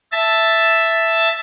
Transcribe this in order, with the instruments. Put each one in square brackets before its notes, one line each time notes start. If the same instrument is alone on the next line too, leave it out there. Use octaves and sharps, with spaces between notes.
[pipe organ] E5 A5